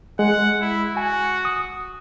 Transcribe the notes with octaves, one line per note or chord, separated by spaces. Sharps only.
G#3 F#5
E4
F#4 G#5
D#6